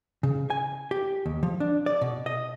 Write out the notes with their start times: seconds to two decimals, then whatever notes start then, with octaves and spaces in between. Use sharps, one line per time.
0.23 C#3
0.50 G#5
0.91 G4
1.26 D#2
1.43 F3
1.60 D4
1.86 D5
2.01 B2
2.26 D#5